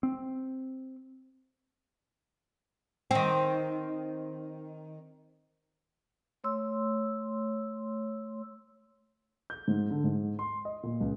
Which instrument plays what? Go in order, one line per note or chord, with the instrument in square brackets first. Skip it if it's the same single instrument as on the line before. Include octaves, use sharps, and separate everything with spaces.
[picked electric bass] C4
[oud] D#3 C4
[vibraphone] A3 C#5 C6 E6
[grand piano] G6
G#2
D3
G#2
C6
D#5
A#2
C#2